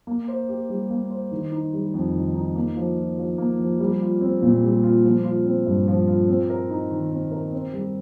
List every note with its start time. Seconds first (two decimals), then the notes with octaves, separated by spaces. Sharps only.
0.07 A#3
0.28 C5
0.49 G4
0.69 G3
0.90 A#3
1.10 C5
1.32 D#3
1.52 D#4
1.73 G3
1.94 F2
2.14 D#3
2.35 D#4
2.55 A#3
2.76 F3
2.96 F4
3.18 F3
3.38 A#3
3.59 F3
3.80 G3
4.01 F4
4.21 C4
4.42 A#2
4.63 G3
4.83 F4
5.04 F3
5.24 F4
5.45 C4
5.66 G2
5.87 F3
6.08 F4
6.28 C4
6.50 A#4
6.70 D#4
6.91 D#3
7.11 C4
7.31 A#4
7.52 C4
7.73 G3